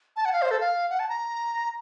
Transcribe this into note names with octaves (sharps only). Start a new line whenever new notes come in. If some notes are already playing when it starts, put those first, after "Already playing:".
A5
F#5
F5
C5
A4
F5
F#5
A5
A#5